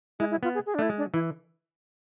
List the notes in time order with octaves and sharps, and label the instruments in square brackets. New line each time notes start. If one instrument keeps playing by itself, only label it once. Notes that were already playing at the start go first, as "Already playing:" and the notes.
[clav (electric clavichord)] G#3 [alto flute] E4
[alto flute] E4
[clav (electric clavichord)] B3 [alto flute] F4
[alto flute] G#4
G#4
D4
[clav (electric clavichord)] A3 [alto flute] E4
[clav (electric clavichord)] G#3
[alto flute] D4
[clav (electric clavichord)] E3 [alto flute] E4